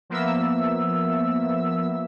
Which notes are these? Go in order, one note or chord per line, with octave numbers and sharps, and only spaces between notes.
F3 A#3 B3 E5 E6